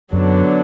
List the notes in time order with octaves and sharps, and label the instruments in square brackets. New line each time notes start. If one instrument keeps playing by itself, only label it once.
[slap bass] F#2 [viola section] D3 F#3 B3 D4